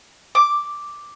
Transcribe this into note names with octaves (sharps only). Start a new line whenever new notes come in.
D6